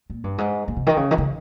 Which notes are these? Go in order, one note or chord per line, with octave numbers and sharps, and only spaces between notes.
A#2
G2
G#2
A#2
C3
D#3
C#3
D#3
C#3